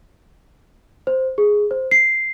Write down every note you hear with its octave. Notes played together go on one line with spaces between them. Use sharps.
C5
G#4
C5
C7